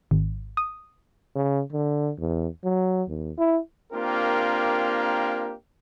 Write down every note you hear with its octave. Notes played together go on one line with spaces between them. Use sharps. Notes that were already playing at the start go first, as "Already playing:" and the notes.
G#1
D#6
C#3
D3
E2
F#3
D#2
E4
A#3 C4 D4 F4 G4 A#4